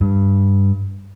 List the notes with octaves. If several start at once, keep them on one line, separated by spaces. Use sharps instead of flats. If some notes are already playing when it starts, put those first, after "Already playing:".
G2